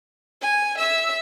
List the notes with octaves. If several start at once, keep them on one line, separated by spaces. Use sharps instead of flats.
G#5
E5 E6